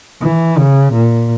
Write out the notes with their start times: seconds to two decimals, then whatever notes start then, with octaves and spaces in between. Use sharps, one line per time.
0.22 E3
0.57 C#3
0.92 A#2